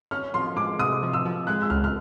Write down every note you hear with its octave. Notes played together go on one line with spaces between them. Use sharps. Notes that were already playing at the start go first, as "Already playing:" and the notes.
C#4 F6
F3 C6
G#3 D6
C3 D#6
F3
E6
F3
G#3 F#6
E6
C#2 F6
F6